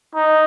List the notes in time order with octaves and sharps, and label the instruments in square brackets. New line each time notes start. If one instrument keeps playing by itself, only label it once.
[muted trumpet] D#4